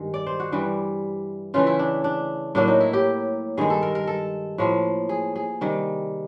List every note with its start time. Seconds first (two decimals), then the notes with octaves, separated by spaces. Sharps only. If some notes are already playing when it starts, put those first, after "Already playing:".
Already playing: G2 D#3 G#3
0.14 D5
0.27 C5
0.40 F#4
0.52 G2 E3 G3
1.54 C#3 E3 A3 F4
1.67 E4
1.79 D4
2.04 D4
2.55 A2 F#3 A#3 D4
2.68 D#4
2.80 E4
2.93 G4
3.57 G2 D#3 G#3 G#4
3.70 A4
3.82 A#4
3.95 A#4
4.07 A4
4.58 A2 F3 A#3
5.09 G#4
5.36 G#4
5.61 C3 D#3 G3